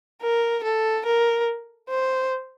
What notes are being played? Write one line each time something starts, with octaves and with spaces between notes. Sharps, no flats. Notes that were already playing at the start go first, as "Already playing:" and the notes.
A#4
A4
A#4
C5